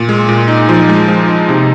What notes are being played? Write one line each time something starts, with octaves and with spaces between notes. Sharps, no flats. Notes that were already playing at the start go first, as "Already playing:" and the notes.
Already playing: A#2
G#3
A#2
D#4
F3
G#3
F3
D#4
C3